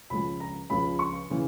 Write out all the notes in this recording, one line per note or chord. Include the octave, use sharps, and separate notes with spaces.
C#2 C#3 F3 G#3 C#4 B5
A#5
C#2 C#3 F3 G#3 C#4 B5
C#6
C#3 E3